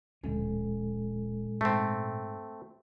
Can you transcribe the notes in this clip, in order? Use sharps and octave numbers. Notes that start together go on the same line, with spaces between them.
D1 A#2 F3 G#3 C#4 A4
G#2 A3 C4